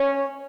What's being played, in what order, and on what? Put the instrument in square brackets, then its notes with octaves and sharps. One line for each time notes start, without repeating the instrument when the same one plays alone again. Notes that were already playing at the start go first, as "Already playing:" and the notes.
Already playing: [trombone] C#4 [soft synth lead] C#5